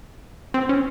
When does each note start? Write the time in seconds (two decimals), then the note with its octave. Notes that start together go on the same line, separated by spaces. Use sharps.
0.54 C4
0.69 C#4